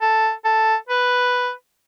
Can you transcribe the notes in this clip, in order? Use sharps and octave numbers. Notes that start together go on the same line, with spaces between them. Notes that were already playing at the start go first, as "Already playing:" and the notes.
A4
A4
B4